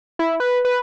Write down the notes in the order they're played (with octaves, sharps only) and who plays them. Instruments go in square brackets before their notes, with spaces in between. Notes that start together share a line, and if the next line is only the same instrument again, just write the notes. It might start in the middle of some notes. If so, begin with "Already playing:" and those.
[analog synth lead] E4
B4
B4